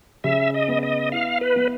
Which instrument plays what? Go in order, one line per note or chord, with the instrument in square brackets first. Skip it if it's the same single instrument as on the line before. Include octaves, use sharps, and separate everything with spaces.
[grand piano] C#3 [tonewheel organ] E5
[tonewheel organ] D#5
[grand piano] B3
[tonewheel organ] D#5
[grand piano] E4 [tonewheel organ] F5
[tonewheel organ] B4
[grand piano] B3